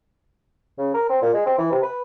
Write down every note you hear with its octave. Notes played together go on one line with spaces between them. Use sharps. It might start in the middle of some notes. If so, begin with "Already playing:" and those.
C#3
A#4
C4
A#2
G#3
C4
E3
C3
B4